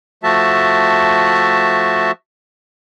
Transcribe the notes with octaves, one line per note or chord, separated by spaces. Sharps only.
F3 A3 F#4 E5 A5